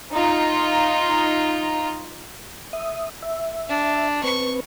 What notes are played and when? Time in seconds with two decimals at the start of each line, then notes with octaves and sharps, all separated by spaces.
0.13 D#4 F4
2.73 E5 D#6
3.22 E5
3.69 D4
4.24 C4 B4 C#6